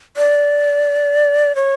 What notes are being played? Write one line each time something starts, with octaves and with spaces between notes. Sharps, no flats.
D5
C#5